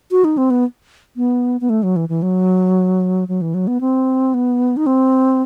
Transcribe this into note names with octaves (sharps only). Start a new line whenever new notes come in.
F#4
D#4
C4
B3
B3
B3
A3
F#3
E3
E3
F#3
F#3
E3
F#3
B3
C4
B3
D#4
C4